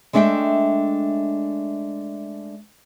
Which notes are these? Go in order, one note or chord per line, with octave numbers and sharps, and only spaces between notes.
G#3 A3 D4 E5 F#5 G5